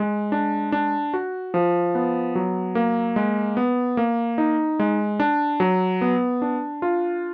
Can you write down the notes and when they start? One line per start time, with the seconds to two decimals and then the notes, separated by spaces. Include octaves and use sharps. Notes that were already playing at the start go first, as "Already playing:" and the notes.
Already playing: G#3
0.32 D4
0.72 D4
1.14 F#4
1.54 F3
1.95 B3
2.35 F#3
2.75 A#3
3.16 G#3
3.57 B3
3.97 A#3
4.38 D#4
4.80 G#3
5.20 D4
5.60 F#3
6.01 B3
6.42 D4
6.82 F4